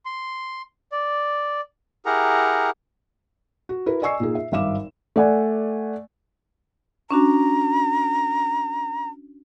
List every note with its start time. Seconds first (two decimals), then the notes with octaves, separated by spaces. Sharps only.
0.05 C6
0.92 D5
2.06 E4 G4 G#4 A#4 F#5 A#5
3.69 F#4
3.86 E4 F#4 A#4 B4
4.02 D5 D#5 G#5 C#6 E6 C7
4.20 A#2 D#4 G#4
4.35 E5
4.52 G#1 G2 E5 F5 D6 E7
5.16 A3 D5 F#5 G#5
7.11 C#4 D4 F#4 A#5